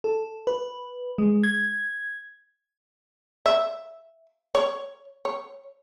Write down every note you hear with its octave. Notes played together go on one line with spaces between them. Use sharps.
A4
B4
G#3
G#6
E5
C#5
C#5